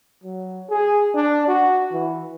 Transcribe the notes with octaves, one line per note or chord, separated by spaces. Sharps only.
F#3
G#4
D4
F#4
E3